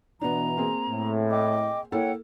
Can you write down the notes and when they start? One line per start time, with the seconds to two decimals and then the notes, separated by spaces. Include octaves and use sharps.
0.21 B2 E3 B3 D4 A#5
0.57 A#3 C4 G#4
0.89 A2
1.30 D#5 G5 D6
1.92 A#3 E4 A4 C#5 F#5 G5